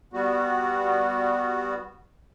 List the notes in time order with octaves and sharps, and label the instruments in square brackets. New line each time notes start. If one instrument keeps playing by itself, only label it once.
[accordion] G3 B3 F#4